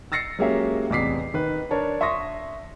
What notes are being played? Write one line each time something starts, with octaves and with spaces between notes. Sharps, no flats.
E6 A6 A#6 C7 C#7
F#3 G#3 A#3 C#4 G4 E5
A1 E2 C3 D6 B6 C7
D#3 B4
D4 A#4 C#5 A5
E5 C6 C#6 D#6 A#6